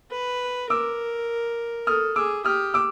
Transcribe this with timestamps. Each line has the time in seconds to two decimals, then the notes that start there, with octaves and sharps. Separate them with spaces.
0.12 B4
0.70 A#4 D6 E6
1.87 A4 D#6 F6
2.16 G#4 D6 E6
2.45 G4 D#6 F6
2.74 D6 E6